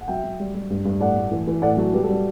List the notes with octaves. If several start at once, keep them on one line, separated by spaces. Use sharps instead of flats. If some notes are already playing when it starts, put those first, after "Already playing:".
F#5
F#3 E5 G5
F#3
G3
G3
G2
G2
A2 D5 F#5
A3
E3
E3
A2 D5 F#5
F#3 F#4 A4
G3 G4 B4
F#4 A4
G3 G4